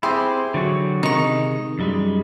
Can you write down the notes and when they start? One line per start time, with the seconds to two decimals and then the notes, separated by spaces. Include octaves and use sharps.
0.03 C4 E4 G4 G#4 C6
0.54 D3 F#3 F#4
1.03 C3 D#3 G#3 D#4 C#6
1.79 F#2 G3 G#3